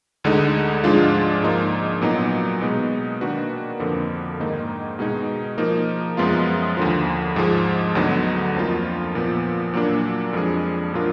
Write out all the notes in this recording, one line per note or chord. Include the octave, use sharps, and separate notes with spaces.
D2 D3 G#3 D#4
G#2 F3 G#3 D4 F4
G#2 F3 A#3 D#4
A#2 F#3 B3 D#4
B2 G#3 B3 D#4
D#3 A#3 D4 F#4 B4
F2 D3 F3 A#3
G#2 D#3 A#3 D#4
B2 G#3 D#4 G#4
F3 A#3 D#4 A#4
F#2 F3 G#3 B3 F4
D#2 D3 F3
G#2 F3 G#3
D2 D3 F#3 B3 D#4
F2 F3 A#3 F4
A#2 F3 B3
A#2 F#3 A#3 D4
F2 F3 G#3 D4 G#4
A#2 F#3 D4 F4 A#4